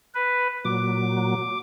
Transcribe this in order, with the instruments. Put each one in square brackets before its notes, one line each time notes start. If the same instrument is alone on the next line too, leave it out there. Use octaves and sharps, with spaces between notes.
[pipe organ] B4
[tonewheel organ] A#2 F#3 [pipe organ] D6